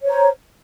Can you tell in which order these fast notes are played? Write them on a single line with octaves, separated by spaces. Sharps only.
C#5 C5 A#5